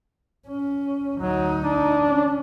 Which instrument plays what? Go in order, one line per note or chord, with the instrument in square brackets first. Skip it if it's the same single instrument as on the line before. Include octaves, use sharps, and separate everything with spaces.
[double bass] C#4
[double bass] D2 D#4 [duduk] F#3
[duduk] D4
[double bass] C#4